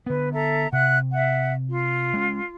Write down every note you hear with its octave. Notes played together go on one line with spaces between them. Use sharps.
D3 B3 B4
A4 E5 A#5
C3 E5 F#5 F#6
E5 F#5
F4
G#3 C#4